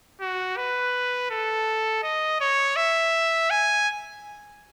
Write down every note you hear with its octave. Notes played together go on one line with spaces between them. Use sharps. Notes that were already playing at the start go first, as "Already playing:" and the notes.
F#4
B4
A4
D#5
C#5
E5
G#5